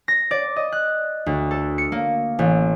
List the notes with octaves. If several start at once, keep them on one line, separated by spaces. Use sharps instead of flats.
A#6
D5
D#5
F#6
D2
A4
C#7
A#3
A1